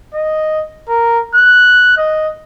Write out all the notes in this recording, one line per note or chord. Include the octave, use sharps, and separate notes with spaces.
D#5
A#4
F#6
D#5